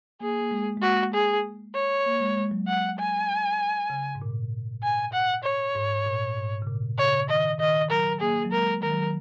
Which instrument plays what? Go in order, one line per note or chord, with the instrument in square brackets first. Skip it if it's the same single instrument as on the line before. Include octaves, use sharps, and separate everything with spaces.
[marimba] A#3 [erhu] G#4
[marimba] A#3
G#3
G#3
[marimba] A#3 [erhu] F#4
[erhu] G#4
C#5
[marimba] A#3
G#3
G#3
F#3
[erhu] F#5
G#5
[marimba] C#3
G#2
A#2
[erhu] G#5
F#5
C#5
[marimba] G#2
A#2
G#2
C#3
A#2
[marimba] C#3 [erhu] C#5
[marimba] D#3 [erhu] D#5
[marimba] D#3 [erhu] D#5
[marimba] F#3 [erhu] A#4
[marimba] A#3 [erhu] G#4
[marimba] F#3
[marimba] G#3 [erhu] A#4
[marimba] D#3 [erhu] A#4
[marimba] F#3
D#3